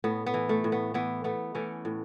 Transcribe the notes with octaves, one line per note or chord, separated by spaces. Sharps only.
A2 B3
B3
E3
A3
A2
B3
E3 B3
A3 B3
E3 A3 C#4
A2